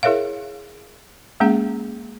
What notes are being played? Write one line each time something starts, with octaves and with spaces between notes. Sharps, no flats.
E4 G#4 A#4 C#5 E5 F5
G#3 A#3 C#4 G#4 F#5